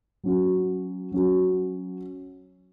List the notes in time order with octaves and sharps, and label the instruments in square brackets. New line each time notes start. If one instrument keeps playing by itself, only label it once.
[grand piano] F#3 C#4 F#4
F#3 C#4 F#4